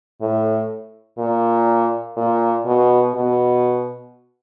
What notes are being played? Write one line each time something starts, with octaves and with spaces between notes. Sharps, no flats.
A2
A#2
A#2
B2
B2